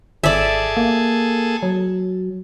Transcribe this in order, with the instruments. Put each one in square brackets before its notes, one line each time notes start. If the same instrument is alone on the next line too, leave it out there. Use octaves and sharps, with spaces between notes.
[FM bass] G#1 [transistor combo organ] G#4 A4 [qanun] D5 E5
[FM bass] A#3
F#3